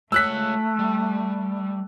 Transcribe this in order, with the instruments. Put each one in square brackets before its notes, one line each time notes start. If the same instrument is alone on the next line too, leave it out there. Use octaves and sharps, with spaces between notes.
[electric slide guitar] G#3 F4 C#5 [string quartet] A3 [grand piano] E6 F#6 B6
[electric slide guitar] G3